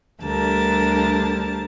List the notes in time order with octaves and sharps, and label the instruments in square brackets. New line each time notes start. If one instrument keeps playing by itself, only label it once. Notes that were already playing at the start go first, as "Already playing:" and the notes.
[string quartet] D2 D3 G3 G4 A#4 A5